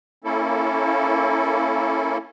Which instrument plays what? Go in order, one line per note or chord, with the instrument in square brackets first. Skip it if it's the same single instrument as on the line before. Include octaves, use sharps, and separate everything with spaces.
[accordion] A#3 C#4 E4 A4